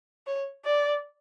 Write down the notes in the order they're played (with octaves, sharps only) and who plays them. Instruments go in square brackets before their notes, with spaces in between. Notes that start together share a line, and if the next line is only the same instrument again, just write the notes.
[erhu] C#5
D5